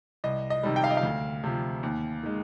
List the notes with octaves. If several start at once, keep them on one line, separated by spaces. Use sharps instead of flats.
C2 D#5
D#5
C3 D#3 G3
G5
F5
D#5
F5
D2
C3 F3
D#2
D#3 G#3